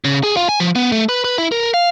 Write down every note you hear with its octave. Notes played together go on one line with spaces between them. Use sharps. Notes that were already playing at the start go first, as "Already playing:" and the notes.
C#3
G#4
F4
G#5
F3
B3
A3
B4
B4
E4
A#4
F5